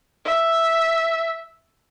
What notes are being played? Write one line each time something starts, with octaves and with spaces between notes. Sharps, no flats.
E5